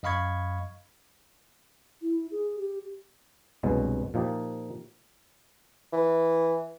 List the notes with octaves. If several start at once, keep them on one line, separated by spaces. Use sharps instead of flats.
F#2 D#5 F5 B5 C#6 G#6
E4
G#4
G4
C2 G2 B2 F#3 G#3
A#2 F3 D#4 G4
E3